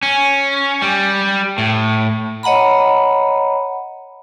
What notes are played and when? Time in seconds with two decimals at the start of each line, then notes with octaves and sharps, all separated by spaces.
0.03 C#4
0.82 G3
1.58 A2
2.43 C#5 D#5 F#5 A#5 B5